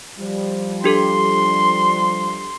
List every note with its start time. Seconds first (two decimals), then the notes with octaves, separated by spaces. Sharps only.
0.18 F3 G3
0.84 D4 G4 A4 C6